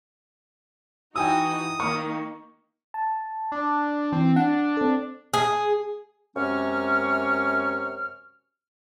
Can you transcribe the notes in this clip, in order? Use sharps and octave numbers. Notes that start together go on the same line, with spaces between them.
E3 D#4 F#4 G5 G#5 D#6 E6
D#3 A#3 C#6 F6
A5
D4
E3 C4
D4 F#5
C4 A4
G#4
F#2 C3 G#3 C#4 C#6 F6